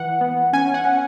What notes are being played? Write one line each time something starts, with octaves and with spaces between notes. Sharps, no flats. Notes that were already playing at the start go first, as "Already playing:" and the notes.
Already playing: E3 F#5
B3
C#4 G#5
F#5
C#4